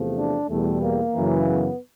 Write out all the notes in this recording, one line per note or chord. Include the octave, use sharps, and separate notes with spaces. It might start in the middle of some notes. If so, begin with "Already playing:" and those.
Already playing: E2 C3 F3 A3
D4
E2 B2 G3 A3
A#3
F#2 C#3 E3
B3